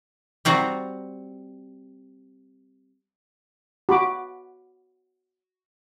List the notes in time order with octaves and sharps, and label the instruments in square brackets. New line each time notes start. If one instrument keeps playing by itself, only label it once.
[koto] G3 C4 F#4 A#5
[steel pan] F#4 B5 D6